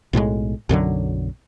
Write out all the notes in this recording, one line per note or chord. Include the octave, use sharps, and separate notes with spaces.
B1 A2 F#3 G#3
B1 F#2 D3 F#3